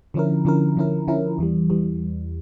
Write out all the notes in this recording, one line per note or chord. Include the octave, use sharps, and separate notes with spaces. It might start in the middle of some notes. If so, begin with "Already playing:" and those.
D3 F3 C#4 E4 A#4
D3 F3 C#4 E4 A#4
D3 F3 C#4 E4 A#4
D3 F3 C#4 E4 A#4
E2 E3 G3
E2 E3 G3